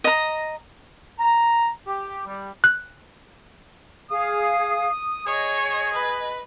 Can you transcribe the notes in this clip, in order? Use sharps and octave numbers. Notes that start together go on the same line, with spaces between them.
D#5 A#5
A#5
G4
G3
F#6
G#4 F5 D#6
G#4 C#5 D#5
B4